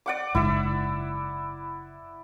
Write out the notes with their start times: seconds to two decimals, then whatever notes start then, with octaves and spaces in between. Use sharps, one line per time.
0.06 D5 F#5 D6
0.35 F#1 G#2 E4 E5